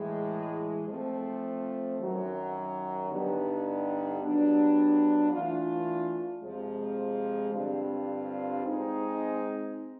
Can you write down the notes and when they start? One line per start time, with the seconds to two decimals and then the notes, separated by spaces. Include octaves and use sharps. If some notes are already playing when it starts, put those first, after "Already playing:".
Already playing: A2 E3 G#3
0.87 F3 A3 C4
1.99 F#2 D#3 F#3
3.09 G2 D3 G3 B3 D#4
4.21 F#3 B3 D4 G4
5.31 E3 A3 D4 F4
6.42 F2 C3 F3 G#3
7.53 G2 D3 G3 C4 F4
8.64 G#3 C4 D#4